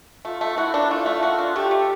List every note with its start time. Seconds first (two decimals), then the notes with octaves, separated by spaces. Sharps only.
0.25 A3 F4
0.41 A3
0.58 E4 F#4
0.74 D4
0.91 A3 F4
1.06 A3
1.23 F#4
1.39 D4
1.56 A3 G4
1.71 A3